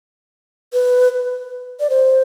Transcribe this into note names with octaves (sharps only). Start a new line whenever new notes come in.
B4
D5
C5